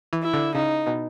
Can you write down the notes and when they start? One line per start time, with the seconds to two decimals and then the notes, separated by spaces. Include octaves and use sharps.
0.13 E3
0.22 E4
0.33 D3
0.54 C#3 D#4
0.87 B2